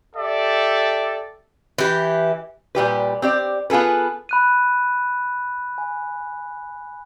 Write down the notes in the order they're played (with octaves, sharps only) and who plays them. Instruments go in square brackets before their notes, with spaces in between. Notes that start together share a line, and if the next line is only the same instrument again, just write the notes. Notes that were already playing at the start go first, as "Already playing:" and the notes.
[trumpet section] G4 A4 D5 E5
[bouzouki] E3 G4
[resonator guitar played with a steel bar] A#2 G3 G4 B4
C4 G4 D5
B3 F4 G#4 A4 B4
[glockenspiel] B5 F#6 D#7
G#5